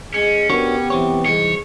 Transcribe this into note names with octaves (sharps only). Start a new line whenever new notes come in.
G#3 C#4
B3 D4 F#4 G4 A#4 C#5
C3 E3 C4 C#5
C2 G#2 E3 D#4 C#5